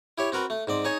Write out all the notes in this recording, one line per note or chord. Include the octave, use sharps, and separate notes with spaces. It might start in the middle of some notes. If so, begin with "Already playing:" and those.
E4 G4 C#5
C4 F#4 A#4 B4
A3
G#2 C4 D5
D#4 G#4 C#5 G#5